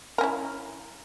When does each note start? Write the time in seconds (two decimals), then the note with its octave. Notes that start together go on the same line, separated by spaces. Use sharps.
0.18 A#4
0.21 C#4
0.23 E4